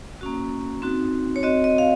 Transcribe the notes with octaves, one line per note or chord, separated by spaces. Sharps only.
A#3 C#4 F#4
C4 D#4 F#4
C#5
C4 F#4 D#5
D#5
F5